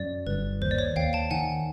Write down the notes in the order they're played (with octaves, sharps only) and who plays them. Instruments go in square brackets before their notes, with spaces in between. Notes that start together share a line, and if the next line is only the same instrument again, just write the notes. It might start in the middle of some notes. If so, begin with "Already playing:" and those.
Already playing: [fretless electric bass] F#2 [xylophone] D5
[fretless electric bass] G1 [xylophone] B4
[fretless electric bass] D#2 [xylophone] C5
[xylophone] D5
C#5
[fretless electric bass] D#2 [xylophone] F5 G5
[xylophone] G5 A5
[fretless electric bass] D#3 [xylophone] F#5 G#5